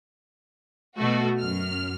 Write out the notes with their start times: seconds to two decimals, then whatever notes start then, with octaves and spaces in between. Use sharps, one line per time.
0.96 B2 A3 F#4
1.40 F#2 F6